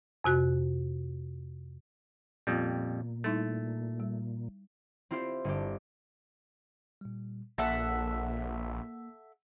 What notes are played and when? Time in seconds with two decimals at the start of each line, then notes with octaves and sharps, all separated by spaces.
0.24 F2 C3 F#4 F#6
2.47 F2 A#2 G3 B3 F4
3.24 G3 A3 D#4 E4
4.00 G3
5.11 C4 E4 F4 G4 C5
5.44 G1 G4
7.01 A#2 G3
7.58 A#1 A#3 A4 E5 F#5